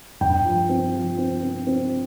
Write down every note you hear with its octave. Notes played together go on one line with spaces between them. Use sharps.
G2 G5
F3
C4
F3
C4
C4
C4